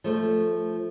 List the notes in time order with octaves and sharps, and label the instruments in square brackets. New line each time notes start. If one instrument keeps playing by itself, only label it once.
[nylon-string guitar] F3 A3